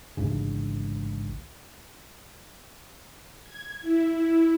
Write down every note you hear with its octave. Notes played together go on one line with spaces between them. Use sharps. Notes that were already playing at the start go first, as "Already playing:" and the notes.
A1 D2 G#2 C#3
G#6
E4